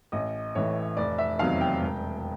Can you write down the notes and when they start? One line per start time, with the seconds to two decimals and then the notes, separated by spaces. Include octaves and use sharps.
0.12 A1 D#5
0.55 A2 E3 C#5
0.97 F1 D5
1.18 E5
1.39 E2 C3 D#3 F#3 F5
1.61 G5
1.82 E1